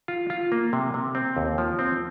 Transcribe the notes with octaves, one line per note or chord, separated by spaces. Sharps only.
F4
F4
A#3
C3
C3
C4
D#2
F3
C4